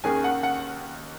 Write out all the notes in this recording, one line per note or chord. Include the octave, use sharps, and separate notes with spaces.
D#2 D#3 A#3 C#4 G#4 G#5
F#5
F#5